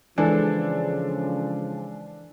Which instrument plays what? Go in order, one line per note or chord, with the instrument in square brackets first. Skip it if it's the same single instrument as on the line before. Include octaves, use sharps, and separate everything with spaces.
[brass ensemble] C#3 F3 [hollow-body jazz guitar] E3 [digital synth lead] G#3 [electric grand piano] D4 A4